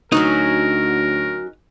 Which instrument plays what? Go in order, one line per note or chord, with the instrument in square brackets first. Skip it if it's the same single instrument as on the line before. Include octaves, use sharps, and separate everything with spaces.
[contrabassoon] D2 [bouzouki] F#3 C#4 F#4 [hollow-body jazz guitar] D#4 [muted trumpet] A#4